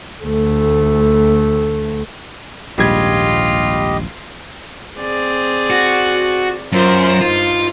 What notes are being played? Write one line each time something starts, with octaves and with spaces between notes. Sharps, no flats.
D2 A3
D#1 A#1 G#2 G3 F4 G4 D#5 G#6
C4 G#4 D5
F#4
F#2 F4 A#4 C5
G2 D#4 F4